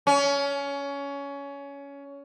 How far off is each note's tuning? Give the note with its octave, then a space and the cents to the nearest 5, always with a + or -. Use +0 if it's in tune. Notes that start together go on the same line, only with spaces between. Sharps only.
C#4 +20